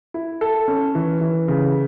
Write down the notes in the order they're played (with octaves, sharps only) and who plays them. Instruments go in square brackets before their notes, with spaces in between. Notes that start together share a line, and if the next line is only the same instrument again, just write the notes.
[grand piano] E4
A4
C#4
E3
E3
C#3